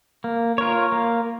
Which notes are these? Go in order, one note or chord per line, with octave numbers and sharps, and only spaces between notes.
A#3
F4 A#4 C#5
A#3